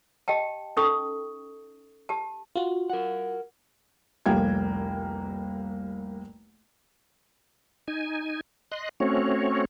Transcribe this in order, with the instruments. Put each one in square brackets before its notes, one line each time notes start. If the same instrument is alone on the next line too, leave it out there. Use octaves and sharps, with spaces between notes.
[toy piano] G4 D#5 G5 A5
C#4 D#4 A4 C#6 D#6
G4 A5
[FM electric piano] F4 F#4
[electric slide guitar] A#4 F#5
[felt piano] F1 C2 A#3 G5 G#6
[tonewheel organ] D#4 G#5
D#5 C6 F#6
A3 C4 C#4 F#4 C#5